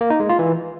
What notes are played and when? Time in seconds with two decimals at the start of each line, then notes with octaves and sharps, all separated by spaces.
0.01 A#3
0.10 D#4
0.20 G#3
0.29 F4
0.39 E3